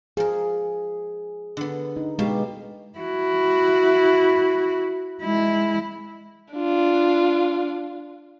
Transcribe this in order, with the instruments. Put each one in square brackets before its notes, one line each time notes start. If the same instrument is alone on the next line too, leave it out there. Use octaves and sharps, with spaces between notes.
[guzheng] F3 A#4 [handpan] G#4
[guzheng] D3 B3
[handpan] D#4
[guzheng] B2 F5 A5 [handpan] G#3 G4
[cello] E4 F#4
G#3 E4
[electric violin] D4 F4